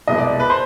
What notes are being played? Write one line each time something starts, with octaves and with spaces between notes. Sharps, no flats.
C2 B2 G#3 D#5
D5
B4
C5